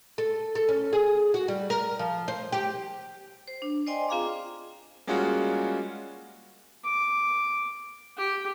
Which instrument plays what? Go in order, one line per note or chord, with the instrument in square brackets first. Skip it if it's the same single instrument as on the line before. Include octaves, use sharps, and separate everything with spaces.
[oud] A4
A4
C#4
G#4
F#4
G3
A#4
F3
C5
G4
[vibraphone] C5
D4
C5 D5 D#5 G5 G#5 C6
C4 F4 G#4 F5 A#5 D6
[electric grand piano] G3 G#3 A#3 C#4 F4 F#4
[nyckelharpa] D6
G4